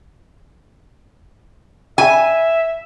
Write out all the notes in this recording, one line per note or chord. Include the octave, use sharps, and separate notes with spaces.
E5 G#5